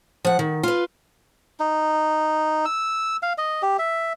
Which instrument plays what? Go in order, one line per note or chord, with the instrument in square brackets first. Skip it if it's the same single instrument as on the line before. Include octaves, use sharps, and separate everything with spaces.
[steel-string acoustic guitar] F3 F#5
D#3
F4 B4
[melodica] D#4
E6
F5
D#5
G4
E5